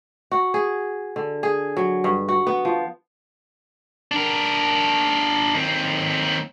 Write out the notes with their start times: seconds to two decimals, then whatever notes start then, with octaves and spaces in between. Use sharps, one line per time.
0.31 F#4
0.54 G#4
1.16 D3
1.43 G#4
1.77 F#3
2.04 G2
2.28 F#4
2.47 B3
2.65 F3
4.12 D4 A#4
5.55 D#2 C4